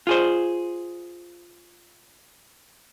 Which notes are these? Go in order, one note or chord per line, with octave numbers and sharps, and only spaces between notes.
F4 G#4 C5